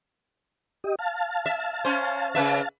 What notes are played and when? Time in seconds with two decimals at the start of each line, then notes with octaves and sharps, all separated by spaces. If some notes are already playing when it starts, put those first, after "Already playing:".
0.84 G4 D#5
0.99 F5 A5
1.46 E5
1.85 C#4 C5
2.35 C#3 B4 E5